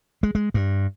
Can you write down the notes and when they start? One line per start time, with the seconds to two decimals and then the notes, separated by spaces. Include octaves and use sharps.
0.23 G#3
0.35 G#3
0.54 G2